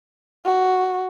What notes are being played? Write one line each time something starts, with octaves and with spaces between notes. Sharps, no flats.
F#4